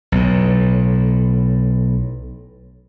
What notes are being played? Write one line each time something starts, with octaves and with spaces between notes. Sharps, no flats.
B1 A2